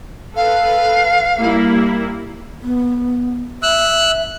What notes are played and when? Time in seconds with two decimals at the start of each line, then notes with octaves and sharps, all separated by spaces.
0.35 A4 B4 F5
1.39 G3 A#3 E4
2.63 B3
3.63 E5 E6 F#6